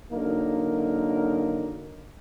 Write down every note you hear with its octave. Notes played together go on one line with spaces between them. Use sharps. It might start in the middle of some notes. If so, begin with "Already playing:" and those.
D3 F#3 A#3 D#4 A#4